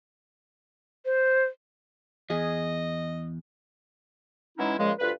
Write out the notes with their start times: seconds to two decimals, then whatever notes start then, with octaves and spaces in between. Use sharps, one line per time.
1.05 C5
2.30 E2 G#4 D#5
4.58 E3 F#3 G#3 C#4 D#4 E4
4.78 A#2 C#3 F3 G#3
4.99 D2 G2 F4 B4